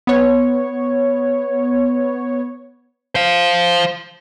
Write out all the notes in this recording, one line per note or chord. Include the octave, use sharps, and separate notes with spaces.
B3 C#5
C5 F5